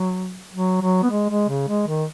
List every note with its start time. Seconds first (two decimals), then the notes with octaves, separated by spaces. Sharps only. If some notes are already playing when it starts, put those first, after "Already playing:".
Already playing: F#3
0.53 F#3
0.81 F#3
1.03 B3
1.11 G#3
1.30 G#3
1.49 C#3
1.68 G#3
1.87 D#3